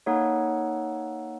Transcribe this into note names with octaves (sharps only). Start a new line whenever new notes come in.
A#3 D#4 A4 C#5 F#5